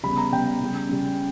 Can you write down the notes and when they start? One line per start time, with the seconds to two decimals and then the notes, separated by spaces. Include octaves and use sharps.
0.03 C#3 G3 B3 B5
0.18 A#5
0.32 C#3 G3 B3 G5
0.60 C#3 G3 C#4
0.89 C#3 G3 C#4